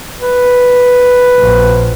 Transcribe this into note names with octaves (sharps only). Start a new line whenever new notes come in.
B4
A#1